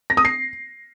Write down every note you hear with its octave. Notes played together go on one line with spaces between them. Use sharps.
A#6
D#6
C7